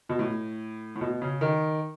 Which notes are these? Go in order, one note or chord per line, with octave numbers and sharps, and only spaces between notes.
B2
A2
A2
B2
C#3
D#3